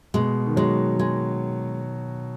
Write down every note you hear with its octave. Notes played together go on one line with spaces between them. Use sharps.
B2 G#3
D#3
F#3 G#3
G#3